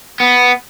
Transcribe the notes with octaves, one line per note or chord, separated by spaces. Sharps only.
B3